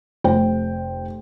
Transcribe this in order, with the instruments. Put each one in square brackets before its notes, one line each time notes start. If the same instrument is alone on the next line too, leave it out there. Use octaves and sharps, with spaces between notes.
[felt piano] F1 C5 G5